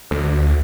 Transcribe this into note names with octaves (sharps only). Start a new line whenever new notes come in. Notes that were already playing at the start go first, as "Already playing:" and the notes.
D2